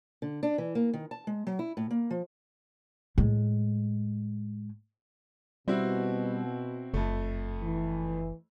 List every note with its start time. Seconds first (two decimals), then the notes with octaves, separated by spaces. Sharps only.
0.22 D3
0.43 D4
0.58 E3
0.75 A#3
0.93 D#3
1.11 A5
1.27 G#3
1.47 F#3
1.59 E4
1.77 A2
1.91 A#3
2.11 F3
3.18 A2 G#3
5.68 B2 G3 C4 E4 F#4
6.94 F#1 F2 A3
7.63 E3